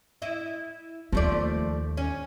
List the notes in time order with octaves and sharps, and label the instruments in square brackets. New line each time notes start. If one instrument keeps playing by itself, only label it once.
[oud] E4 D#5
[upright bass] D#2 [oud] F3 A3 D5
[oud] C#4